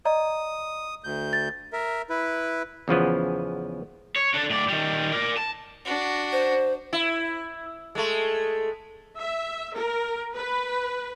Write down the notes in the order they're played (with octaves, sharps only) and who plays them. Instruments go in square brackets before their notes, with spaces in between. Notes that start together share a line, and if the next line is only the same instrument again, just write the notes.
[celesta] D5 D#5 A#5 [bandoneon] D#6
[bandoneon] D2 G6
[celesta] A6
[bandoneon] A#4 E5
E4 B4
[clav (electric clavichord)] E2 C#3 F3 B3
[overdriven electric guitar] C#5
D4 A4
A2 D5
D#3 G3
A#4 D5
A5
[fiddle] D4 F#4
[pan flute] C5
[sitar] E4
G#3 A3
[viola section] E5
A#4
B4